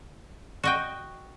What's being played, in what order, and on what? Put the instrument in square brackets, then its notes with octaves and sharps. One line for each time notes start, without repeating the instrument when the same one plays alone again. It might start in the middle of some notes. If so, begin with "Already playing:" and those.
[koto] F#4 D#5 G5